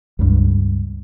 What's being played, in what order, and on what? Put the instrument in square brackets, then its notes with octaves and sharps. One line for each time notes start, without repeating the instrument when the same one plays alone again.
[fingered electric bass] C#2 G2